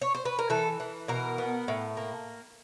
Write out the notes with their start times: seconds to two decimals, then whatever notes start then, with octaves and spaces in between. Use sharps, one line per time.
0.02 C#5
0.15 C5
0.25 B4
0.39 A#4
0.50 E3 A4
0.80 E3
1.08 B2 A#4
1.38 B3
1.68 A2
1.97 A#3